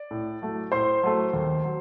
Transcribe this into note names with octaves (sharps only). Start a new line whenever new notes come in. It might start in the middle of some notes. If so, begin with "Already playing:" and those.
Already playing: D5
A2
F#3 A3
A2 C5 C6
F#3 A3
D#2
F#3